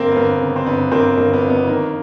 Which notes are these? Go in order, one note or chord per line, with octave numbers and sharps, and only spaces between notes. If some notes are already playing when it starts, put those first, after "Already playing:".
Already playing: G1 F2 A#3 C4
B3
G1 A#3
C#3
C4
G1 B3
G1 A#3 C4
G1 A#3
B3
F2
B3
D#3 A#3